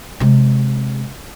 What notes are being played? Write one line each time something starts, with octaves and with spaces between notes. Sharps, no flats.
C3 G#3